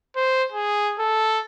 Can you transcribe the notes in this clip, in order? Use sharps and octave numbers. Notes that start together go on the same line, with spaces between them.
C5
G#4
A4